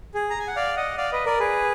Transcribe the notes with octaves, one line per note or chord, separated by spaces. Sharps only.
G#4
A#5
G#5
F#5
D5 F5
D#5 F#5
D5 F5
B4 D#5
A#4 D5
G#4 B4